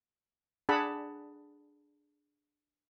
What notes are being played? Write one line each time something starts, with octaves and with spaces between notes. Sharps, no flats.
D4 G#4 F#5 A5 B5